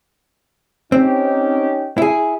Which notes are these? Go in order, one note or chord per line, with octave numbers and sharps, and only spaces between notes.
C4 C#4 D#4 G4
E4 G#4